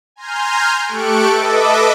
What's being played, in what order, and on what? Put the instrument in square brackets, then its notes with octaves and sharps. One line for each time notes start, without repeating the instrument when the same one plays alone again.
[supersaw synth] G#5 A#5 C6 F6 G6
A3 G4 A4 C#6 F#6 D7
A4 B4 D#5 E5 D6